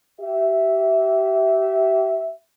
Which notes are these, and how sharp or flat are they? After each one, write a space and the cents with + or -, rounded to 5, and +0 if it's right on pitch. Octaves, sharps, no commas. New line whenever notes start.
G4 -30 E5 -5